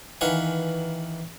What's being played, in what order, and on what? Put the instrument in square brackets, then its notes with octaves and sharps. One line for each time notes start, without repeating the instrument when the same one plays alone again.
[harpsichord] D#3 E3 B4 F5 F#5 G#5